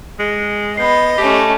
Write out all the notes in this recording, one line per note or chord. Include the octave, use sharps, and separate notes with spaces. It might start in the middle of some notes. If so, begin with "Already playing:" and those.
G#3
B3 D#5 B5 G6 C7
A3 C#4 G4